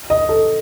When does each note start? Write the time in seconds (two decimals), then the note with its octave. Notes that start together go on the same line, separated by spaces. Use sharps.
0.10 D#5
0.29 A4